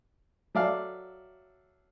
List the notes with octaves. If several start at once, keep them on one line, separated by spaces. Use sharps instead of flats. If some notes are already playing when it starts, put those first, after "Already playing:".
F#3 A4 D5 E5 F5